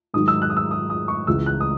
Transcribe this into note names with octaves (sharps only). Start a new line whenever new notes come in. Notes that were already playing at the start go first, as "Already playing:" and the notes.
G#2 D#3 F#3 D#6
E6
F#6
D#6
E6
D#6
D#6
C#6
C#2 C#3 E3 G#3 E6
F#6
D#6